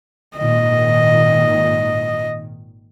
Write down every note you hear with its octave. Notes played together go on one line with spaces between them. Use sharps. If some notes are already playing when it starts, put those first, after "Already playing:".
G#1 A#2 D#3 D#5